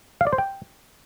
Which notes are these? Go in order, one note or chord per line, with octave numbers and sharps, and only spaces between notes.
F5
D5
C5
G5